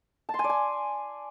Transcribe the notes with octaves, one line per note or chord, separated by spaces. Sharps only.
A5
C6
G#5
D5
G#5